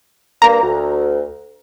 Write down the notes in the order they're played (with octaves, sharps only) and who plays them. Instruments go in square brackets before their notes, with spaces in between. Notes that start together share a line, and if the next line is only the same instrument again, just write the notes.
[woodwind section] G2 A#3 [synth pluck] A#5
[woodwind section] D2